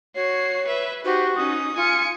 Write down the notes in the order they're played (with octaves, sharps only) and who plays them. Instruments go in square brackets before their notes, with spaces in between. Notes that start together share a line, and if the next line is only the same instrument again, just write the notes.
[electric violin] F#4 C7 [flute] C#5
[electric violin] B4 E5
[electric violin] D#4 G4 [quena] F#4 [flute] C5
[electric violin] C#4 D#4 [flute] D#6
[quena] F4 [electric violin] G#5 C#7